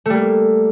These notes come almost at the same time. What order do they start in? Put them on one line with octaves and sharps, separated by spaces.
A3 G3 A#3